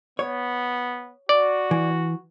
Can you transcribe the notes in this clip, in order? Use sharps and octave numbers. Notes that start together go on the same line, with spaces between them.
B3 C#5
F#4 D5
E3